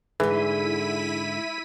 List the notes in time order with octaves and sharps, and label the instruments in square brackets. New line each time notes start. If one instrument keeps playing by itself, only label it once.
[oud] G#2 D3 [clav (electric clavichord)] E3 [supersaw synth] E4 B6 D#7 [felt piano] G#4